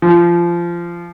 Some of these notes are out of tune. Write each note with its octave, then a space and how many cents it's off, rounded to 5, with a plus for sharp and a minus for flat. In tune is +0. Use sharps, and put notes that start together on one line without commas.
F3 -20